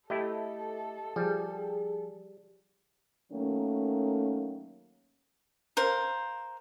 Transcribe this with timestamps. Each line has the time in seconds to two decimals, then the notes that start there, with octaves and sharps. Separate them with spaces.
0.10 A3 E4 G4 A4 D#5
1.16 F3 G3 G#4
3.32 D#3 F#3 A3 A#3 C#4
5.77 A#4 C5 F5